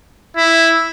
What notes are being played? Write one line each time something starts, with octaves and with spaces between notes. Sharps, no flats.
E4